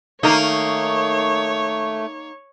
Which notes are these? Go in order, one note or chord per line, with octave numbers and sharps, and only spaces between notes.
D#3 A3 A#3 D#4 A#4 C#5